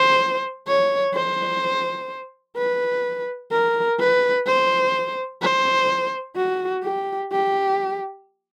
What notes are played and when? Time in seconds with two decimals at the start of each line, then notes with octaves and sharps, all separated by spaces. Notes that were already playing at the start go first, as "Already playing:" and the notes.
Already playing: C5
0.68 C#5
1.14 C5
2.57 B4
3.52 A#4
3.99 B4
4.47 C5
5.42 C5
6.37 F#4
6.83 G4
7.32 G4